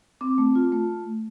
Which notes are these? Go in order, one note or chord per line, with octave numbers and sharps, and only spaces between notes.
C4 D6
A3
F4
A3